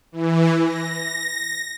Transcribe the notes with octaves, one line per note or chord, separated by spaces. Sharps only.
E3
A#6